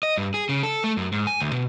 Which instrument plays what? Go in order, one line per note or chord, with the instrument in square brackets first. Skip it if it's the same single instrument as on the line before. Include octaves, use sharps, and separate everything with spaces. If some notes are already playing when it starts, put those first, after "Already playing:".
[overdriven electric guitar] D#5
G2
G#4
C#3
A4
A3
F#2
G#2
G#5
D2
B2